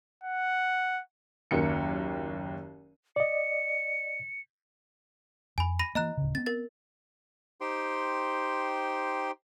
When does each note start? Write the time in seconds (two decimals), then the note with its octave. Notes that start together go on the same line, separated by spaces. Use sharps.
0.24 F#5
1.51 F#1 D#2 F#3 C#7
3.16 D5 D#5 C#7
5.58 F2 G#5 B5
5.79 B5 A#6 D#7
5.95 E3 A#3 D#5 A#5 F#6
6.17 D1 C#3
6.35 B3 C4 A6
6.46 A#4 A6
7.61 D#4 G4 C5 G5 C6